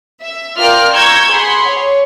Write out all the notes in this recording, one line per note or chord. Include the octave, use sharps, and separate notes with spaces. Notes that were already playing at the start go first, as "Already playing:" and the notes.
E5
F4 A#4 D5 G5 F6
A#5 C#6 E6 G6 G#6
G#4 F#5 B5 C6
C#5